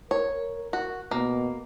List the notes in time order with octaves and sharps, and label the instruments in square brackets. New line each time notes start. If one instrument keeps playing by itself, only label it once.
[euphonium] A#4 [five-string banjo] C#5
[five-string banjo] F#4
[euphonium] B2 [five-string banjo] A#3